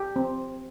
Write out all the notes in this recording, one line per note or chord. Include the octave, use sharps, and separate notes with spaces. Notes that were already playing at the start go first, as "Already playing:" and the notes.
Already playing: G4
C4